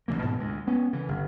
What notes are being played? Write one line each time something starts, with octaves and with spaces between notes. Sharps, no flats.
A1 B2 E3 A#3
G#2 B2 E3
D2 G#3
B3 C#4
C#3 E3
G1